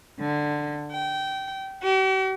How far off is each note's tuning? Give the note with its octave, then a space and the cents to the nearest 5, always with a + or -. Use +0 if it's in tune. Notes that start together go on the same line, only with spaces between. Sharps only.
D3 +10
G5 -20
G4 -45